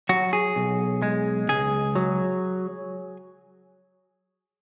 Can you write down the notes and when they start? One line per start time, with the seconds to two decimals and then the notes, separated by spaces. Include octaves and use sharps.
0.09 F#3 F#4
0.33 G#4
0.56 B1
1.02 G#3
1.49 C#2 G#4
1.96 F#3